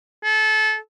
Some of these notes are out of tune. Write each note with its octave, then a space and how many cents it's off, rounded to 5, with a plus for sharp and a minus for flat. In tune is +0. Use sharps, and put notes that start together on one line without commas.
A4 -25